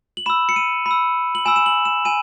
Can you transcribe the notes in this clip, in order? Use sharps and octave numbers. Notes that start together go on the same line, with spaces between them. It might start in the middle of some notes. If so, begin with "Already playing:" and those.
F#7
B5 E6 E7
C#7
D#7
B5
E6
F#7
G#5 B5 E6 E7
E7
F#7
E7
G#5 D#7